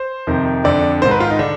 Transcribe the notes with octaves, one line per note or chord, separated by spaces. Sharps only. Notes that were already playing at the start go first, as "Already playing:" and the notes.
Already playing: C5
F2 C3 D#3
F2 D3 D5
G#2 D#3 C5
B4
F4
D#4
D3 D4